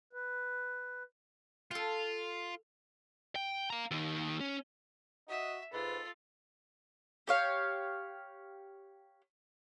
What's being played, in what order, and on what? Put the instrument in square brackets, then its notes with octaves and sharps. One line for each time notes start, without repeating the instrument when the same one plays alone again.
[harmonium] B4
[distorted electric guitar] F4 [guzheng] A4 G5
[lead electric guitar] G5
F5 A#5
D#2 D#3
C#4
[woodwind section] F#4 [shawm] D#5 [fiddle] E5
[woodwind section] G#2 [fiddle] F4 [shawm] A4 [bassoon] B4
[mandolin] G4 C#5 F5